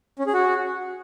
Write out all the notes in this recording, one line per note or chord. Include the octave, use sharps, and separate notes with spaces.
C#4
G#4
F#4